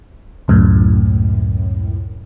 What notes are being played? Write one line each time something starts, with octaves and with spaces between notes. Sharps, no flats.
C#2 F#2 A2